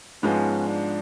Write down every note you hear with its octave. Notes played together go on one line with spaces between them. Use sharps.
G#2 F3 G#3 B3 C#4
D4